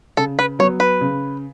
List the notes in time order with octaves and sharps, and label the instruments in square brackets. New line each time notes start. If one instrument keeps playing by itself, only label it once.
[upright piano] C#3 [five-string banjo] A4
[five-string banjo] B4
[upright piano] F#3 B3 [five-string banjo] C#5
[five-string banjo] B4
[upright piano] C#3